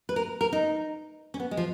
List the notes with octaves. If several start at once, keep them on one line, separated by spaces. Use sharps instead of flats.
B4
A#4
A#4
D#4
C#4
B3
G#3
F3